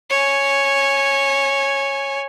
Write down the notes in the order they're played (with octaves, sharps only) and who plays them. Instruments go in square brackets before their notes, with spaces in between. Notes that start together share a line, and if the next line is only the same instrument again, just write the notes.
[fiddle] C#5 G#5